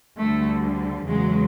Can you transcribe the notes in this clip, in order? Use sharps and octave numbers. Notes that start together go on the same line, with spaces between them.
D2 D3 G3 A3
E2 C#3 F#3 G#3